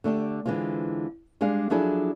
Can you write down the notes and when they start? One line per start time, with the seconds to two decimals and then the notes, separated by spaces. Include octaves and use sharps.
0.04 D3 A3 D4 G4
0.46 D3 E3 G#3 C4 F4
1.41 G3 G#3 D4 G#4 F5
1.70 F3 F#3 D4 E4 G#4 A4